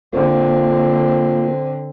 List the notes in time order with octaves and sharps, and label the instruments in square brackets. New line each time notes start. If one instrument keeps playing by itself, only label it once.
[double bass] D3 C4 [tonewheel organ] A#3 F4